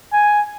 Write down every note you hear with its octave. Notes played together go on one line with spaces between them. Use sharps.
G#5